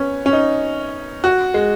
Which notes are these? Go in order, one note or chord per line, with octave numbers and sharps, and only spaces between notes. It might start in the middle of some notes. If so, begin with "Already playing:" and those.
Already playing: B3 C#4
C#4
D#4
F#4
G#3